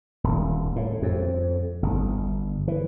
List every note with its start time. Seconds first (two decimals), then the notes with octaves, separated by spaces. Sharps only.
0.24 D#1
0.76 A2
1.02 F2
1.83 G1
2.68 E3